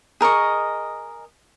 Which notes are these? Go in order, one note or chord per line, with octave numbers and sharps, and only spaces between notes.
G#4 A#4 D#5 C#6